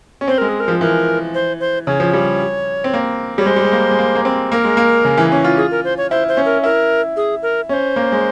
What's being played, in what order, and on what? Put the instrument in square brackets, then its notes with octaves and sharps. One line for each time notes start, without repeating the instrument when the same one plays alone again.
[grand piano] C#4
[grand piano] C4 [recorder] C5
[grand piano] G#3 [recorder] A#4
[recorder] G#4
A#4
[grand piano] F3
[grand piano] E3 [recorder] A#4
[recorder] C5
C5
[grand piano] C#3 [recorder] C#5
[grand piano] F3
G3
C4
A#3
[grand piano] G3 [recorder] C#5
[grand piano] G#3 [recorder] C5
[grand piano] G3
G#3
A#3
G#3
A#3
A#3
C4
[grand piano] A#3 [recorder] A#4
[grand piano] G#3
A#3
C#3
E3
C#4
F4
[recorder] G#4
A#4
C5
C#5
[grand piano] E4 [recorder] C5
[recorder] C5
[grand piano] C#4
[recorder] A#4
[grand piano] E4 [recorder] A#4
[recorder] G#4
A#4
[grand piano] C#4 [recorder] C#5
[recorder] C5
[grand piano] A#3
G#3